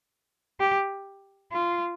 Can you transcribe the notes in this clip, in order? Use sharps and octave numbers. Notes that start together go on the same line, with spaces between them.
G4
F4